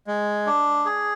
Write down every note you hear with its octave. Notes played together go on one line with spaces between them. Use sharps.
G#3
D4
G#4